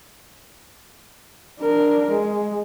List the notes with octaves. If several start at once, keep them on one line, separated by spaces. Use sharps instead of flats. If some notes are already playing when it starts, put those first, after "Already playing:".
D4 A#4
G#3